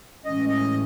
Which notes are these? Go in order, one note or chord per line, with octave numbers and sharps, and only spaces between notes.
A2 E3 G#3 C#4 D#5
D#5